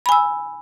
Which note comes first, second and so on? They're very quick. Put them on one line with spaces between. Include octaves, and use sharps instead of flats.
B5 G#5 E6